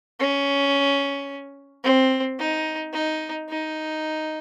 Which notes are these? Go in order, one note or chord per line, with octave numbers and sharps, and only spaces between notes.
C#4
C4
D#4
D#4
D#4